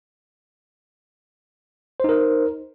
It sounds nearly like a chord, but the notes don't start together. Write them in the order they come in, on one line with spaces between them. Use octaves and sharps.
C5 D#4 A#4